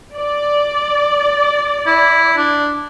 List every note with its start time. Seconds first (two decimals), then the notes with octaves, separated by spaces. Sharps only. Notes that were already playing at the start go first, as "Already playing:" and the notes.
0.15 D5
1.87 E4
2.37 D4